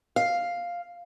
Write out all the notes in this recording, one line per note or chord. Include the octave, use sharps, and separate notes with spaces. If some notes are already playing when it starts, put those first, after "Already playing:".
F5